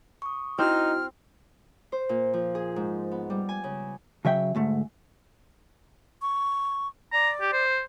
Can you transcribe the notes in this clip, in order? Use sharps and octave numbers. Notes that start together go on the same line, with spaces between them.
C#6 D#6
C4 D#4 E4 F#4 C5 F6
C5
A#2
F3
G#4
G#2
B3
G3
G#5
C#3
C#3 F#3 E5 G5
D2 G#2 A3
C#6
D5 A#5
G4
C5